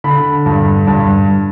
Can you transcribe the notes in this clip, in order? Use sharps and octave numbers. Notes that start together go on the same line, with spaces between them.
D3 B5
G2
G2